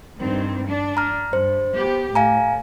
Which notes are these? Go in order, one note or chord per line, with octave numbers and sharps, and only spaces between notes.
G2 D#3 C4
D4
A#5 F6
G2 C5
B3 G4
A2 F5 G#5 A#5